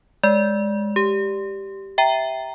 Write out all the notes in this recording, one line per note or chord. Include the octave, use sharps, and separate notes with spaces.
G#3 D5
G4
E5 G5 A#5